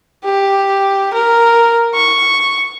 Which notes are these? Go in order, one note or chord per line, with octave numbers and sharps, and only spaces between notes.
G4
A#4
C#6